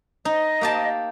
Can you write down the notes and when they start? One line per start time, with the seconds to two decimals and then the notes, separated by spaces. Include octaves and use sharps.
0.25 D#4 D#5
0.61 A#3 G4 A5